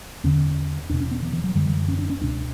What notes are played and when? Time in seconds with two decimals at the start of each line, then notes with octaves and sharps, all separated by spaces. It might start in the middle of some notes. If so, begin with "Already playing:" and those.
0.24 E2 D3 C#4
0.90 E2 B2 D4
1.00 C#4
1.11 B3
1.22 E3
1.33 E3
1.44 F#3
1.55 F#2 D3 G3
1.66 E3
1.88 C#4
1.99 D4
2.10 C#4
2.21 C#2 B2 D4